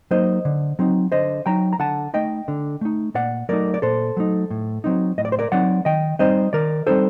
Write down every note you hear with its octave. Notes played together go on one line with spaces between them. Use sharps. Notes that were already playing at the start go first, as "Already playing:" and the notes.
F#3 A#3 D#4 C5 D#5
D3
F#3 C4 D#4
D3 C5 D#5
F#3 C4 D#4 G5 A#5
A#5
D3 F#5 A5
A3 D#4 D#5 G5
D3
A3 D#4
A#2 D5 F#5
F#3 A3 D#4 A#4 D5
D5
A#2 A4 C5
F#3 A3 D#4
A2
F#3 C4 D#4
A2 D#5
D5
C5
A#4 D5
F#3 C4 D#4 D5 F#5
D#3 D#5 G5
G3 C4 D#4 C5 D#5
D#3 A#4 D5
G3 C4 D#4 A4 C5